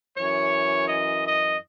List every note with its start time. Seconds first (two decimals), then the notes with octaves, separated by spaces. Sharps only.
0.16 F#2 E3 C#5
0.88 D#5
1.25 D#5